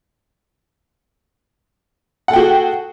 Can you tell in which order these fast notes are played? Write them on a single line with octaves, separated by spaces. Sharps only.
F#5 A4 G5 F#4 G#4